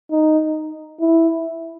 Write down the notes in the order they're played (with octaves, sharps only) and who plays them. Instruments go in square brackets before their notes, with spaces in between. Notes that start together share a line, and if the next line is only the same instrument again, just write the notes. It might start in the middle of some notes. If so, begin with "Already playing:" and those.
[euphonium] D#4
E4